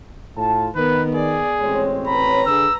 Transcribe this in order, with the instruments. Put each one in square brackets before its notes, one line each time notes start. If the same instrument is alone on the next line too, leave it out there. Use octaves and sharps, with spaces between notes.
[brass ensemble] A2 F4 A5
[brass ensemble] D#3 [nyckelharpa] B3 A#4 [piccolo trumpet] B4
[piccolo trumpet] G#4 [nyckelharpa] D5
[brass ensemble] A1 C4 C#5 [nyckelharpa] G#3
[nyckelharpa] B4 A#5 [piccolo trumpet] B5
[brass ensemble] D3 G#4 [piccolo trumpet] E6